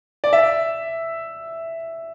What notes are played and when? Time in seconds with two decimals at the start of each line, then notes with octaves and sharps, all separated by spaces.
0.24 D5
0.33 E5